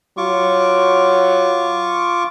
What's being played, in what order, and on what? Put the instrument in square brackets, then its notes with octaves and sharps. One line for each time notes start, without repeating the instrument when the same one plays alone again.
[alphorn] F#3 [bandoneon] F4 C#6 D6